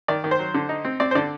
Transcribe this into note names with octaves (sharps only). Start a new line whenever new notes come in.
D#3 D5
D#3
C5
F#3
D3
D#4
C4
C4 D5
C5
D3 D5